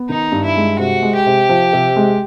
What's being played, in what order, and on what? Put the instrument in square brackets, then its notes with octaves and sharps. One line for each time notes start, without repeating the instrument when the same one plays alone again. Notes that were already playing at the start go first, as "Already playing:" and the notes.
Already playing: [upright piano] B3
[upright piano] D#3 [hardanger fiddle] D#4
[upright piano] G2
[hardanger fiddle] E4
[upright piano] G#3
[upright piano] C3 [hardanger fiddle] F#4
[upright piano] G#3
[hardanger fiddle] G4
[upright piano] C3
F3
C3
G#3